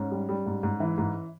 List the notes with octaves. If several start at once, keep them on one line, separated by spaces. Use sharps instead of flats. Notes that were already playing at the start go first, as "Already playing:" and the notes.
Already playing: G#2 C#4
G3
G3
G#2
G#2
E3
G#2